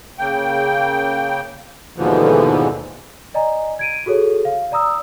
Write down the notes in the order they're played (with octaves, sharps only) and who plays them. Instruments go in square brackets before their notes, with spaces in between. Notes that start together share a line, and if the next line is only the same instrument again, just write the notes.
[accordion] C#3 A#3 G5
D#2 G#2 B2 D3 E3 F3
[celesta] D5 D#5 G#5 A#5
G#6 D7 D#7
F#4 G#4 A4 C#5
F5
D5 A#5 D#6 E6